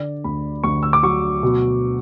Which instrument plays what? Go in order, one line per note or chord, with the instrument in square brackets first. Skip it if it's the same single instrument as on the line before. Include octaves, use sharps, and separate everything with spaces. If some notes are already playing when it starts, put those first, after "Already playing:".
Already playing: [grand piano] D3 D5
D2 B5
D2 C#6
E6
D6
F#3 C#6
B2